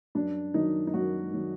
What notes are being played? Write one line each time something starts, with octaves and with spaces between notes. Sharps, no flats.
F#2 D4
D#3 F#3 D#4
D#4
F#2 F#4
D#3 F#3